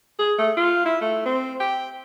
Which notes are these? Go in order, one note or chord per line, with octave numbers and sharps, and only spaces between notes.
G#4
A3
F4
E4
A3
C4
G5